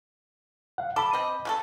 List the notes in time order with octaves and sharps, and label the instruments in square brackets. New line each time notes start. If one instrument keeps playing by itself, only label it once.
[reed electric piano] F5 F#5
[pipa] A4 [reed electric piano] B5 D6
[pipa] C4 D#5
C#3 F#4 A4